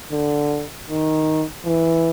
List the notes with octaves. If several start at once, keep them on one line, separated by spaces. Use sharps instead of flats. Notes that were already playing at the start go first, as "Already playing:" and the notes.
D3
D#3
E3